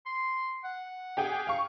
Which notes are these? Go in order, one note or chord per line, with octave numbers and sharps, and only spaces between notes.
C6
F#5
G4 G#4 G5
F5 C#6